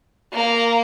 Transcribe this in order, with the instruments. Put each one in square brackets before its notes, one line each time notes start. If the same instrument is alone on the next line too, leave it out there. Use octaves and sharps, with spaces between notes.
[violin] A#3